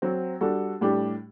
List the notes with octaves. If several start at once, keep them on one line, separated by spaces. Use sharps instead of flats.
F#3 C4 F#4
G3 D4 F#4 A4
A2 G3 D4 G4